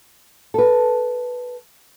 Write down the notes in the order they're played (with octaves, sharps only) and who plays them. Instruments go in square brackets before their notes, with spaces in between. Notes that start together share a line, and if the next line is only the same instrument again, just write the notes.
[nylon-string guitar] A4 B4